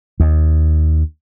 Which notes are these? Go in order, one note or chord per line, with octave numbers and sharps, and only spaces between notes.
D#2